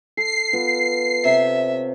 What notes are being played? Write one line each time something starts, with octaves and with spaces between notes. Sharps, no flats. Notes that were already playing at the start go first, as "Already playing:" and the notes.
A4 C7
B3 F4
C3 C#5 E5 F5